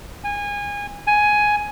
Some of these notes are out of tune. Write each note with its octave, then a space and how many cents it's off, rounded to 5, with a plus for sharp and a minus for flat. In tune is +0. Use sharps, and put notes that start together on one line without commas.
G#5 -25
G#5 +10